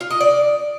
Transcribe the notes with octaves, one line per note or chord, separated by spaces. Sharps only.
F4
D#5
D5